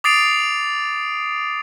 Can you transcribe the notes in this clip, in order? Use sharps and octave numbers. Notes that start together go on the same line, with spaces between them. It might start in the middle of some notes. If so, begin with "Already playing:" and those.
D6 D#6 A6 C7 D7 F7